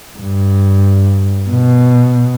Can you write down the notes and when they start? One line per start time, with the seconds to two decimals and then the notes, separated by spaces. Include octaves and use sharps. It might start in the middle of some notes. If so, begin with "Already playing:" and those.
0.18 G2
1.49 B2